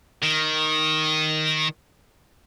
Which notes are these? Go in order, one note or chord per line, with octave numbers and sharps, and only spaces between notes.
D#3